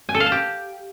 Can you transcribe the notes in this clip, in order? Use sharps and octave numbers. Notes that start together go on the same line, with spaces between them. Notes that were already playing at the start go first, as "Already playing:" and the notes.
G#5
A4
F5
A5
G4